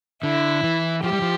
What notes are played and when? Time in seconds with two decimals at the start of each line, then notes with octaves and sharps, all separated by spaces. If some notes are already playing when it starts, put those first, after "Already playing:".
0.23 D3 E4
0.64 E3
1.03 F3 G4
1.13 G3
1.22 F3